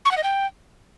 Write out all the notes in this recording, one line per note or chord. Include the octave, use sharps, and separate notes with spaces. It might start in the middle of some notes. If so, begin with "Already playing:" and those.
C#6
F#5
D#5
G5